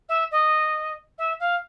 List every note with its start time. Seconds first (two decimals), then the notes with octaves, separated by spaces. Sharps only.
0.09 E5
0.31 D#5
1.18 E5
1.40 F5